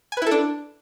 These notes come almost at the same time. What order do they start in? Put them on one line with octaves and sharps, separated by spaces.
G#5 B4 E4 A4 D4